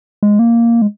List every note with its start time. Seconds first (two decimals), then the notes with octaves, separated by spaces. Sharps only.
0.23 G#3
0.39 A#3
0.82 G#3